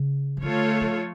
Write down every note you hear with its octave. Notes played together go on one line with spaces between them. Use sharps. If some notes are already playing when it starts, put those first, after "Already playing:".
Already playing: C#3
F3
D3 A3 F4 A4 C#5
F3